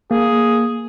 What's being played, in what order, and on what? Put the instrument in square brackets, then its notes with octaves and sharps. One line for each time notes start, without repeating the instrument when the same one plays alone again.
[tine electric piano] A#3 [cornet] G#4